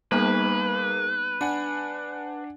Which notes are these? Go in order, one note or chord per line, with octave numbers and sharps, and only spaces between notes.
G3 A#3 B3 D#4 G#4 B4
D4 F#5 G#5 F#6